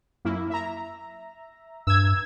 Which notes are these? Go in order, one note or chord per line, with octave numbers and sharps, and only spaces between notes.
F#2 A#3 E4
E5 A#5
G2 E6 G#6